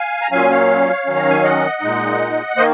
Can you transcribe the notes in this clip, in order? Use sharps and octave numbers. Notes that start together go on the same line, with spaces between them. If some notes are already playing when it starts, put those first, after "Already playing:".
Already playing: F5 G#5
A#5
A#2 F#3 C#4 F5 G#5
C#5 F5
D#3 F#3 C#4
A#5
G#5
D#5 F#5
A#2 G#3 D#4
D#3 A#3 C5 D#5